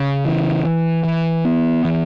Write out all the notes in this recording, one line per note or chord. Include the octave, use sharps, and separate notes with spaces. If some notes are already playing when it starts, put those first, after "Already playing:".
Already playing: C#3
E3
E3
E3
B3
E3